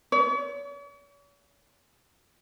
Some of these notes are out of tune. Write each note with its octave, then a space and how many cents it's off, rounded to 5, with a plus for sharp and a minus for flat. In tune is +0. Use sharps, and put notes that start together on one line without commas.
C#5 +45